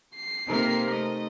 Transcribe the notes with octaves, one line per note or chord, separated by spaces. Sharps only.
C7
C3 A#3 D#4 A4 A#4 C5
A3 D#5